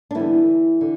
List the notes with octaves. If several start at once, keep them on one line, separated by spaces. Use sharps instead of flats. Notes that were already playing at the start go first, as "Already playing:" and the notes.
D4
D3 E3 G3 B3 E4
D3